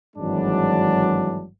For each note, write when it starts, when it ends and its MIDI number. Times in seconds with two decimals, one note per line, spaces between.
0.17 1.45 32
0.17 1.45 43
0.17 1.45 52
0.17 1.45 54
0.17 1.45 56
0.17 1.45 62